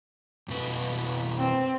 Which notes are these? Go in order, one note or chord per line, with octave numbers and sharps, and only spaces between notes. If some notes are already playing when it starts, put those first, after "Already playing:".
F2 B2 B4
C4